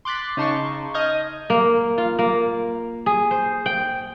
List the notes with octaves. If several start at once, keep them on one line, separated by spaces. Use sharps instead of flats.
C6 D6 F#6 A6 B6
C#3 D#4 A5 C6 C#6
D#5 D#6 F6 G6 G#6
A#3
F4
A#3
G#4
C5
G5